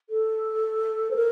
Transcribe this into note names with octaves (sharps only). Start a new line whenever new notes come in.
A4
C5
A#4